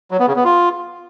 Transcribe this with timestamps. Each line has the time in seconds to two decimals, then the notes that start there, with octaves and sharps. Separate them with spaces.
0.11 F#3
0.19 B3
0.28 C#3
0.36 B3
0.44 F4